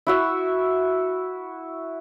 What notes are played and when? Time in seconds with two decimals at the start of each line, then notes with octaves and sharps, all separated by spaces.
0.07 E4 F#4 E5